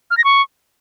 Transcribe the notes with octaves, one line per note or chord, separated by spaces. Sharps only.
F6
A#6
C#6